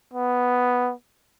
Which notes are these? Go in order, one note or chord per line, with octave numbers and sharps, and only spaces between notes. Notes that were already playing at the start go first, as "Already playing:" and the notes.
B3